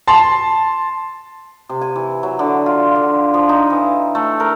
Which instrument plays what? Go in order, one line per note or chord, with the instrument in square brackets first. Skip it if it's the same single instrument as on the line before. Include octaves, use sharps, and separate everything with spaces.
[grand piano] A5 C6
[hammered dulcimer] C3
G#5
E3
F#3
D3
F4
D3
F3
D#4
E3
A3
A#4